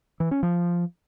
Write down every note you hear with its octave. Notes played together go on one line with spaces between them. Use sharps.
E3
C#4
F3